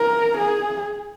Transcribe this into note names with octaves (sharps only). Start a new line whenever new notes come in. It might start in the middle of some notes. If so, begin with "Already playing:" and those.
Already playing: A#4
G#4